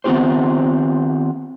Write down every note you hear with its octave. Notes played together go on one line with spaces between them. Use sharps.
D#3 B3 C4 F4 G4 C5